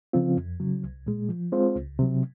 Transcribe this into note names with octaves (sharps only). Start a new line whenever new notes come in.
C#3 F3 C4 F4
F2
C#3 F#3
C2
A#2 G#3
F3
G#3 C4 F4 C5
C#2
C3 F#3